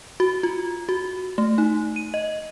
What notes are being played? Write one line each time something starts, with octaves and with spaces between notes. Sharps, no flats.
F#4
F4
F#4
A3
D#4
D#7
D#5